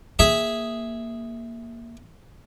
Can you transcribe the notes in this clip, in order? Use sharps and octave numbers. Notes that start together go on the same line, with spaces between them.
A#3 G#4 E5